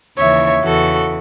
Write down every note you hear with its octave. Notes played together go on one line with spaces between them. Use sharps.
D#2 C#3 E3 C#5 E5
E2 C#3 E3 F#4 A4